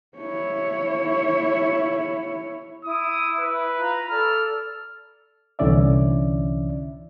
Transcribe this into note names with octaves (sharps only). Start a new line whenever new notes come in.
E4 C#5
E4 D#6
B4
F4 A#5 B5
A4 D5 F6
C2 D3 E3 C#4 D5 E5